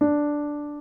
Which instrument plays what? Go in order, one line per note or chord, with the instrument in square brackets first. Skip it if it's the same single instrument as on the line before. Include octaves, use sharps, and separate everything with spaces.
[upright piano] D4